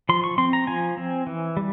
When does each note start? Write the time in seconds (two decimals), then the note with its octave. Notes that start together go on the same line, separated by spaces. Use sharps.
0.09 F3 C6
0.24 C#6
0.38 C4 C6
0.53 A#5
0.67 F3 G#5
0.97 C4
1.27 E3
1.57 G3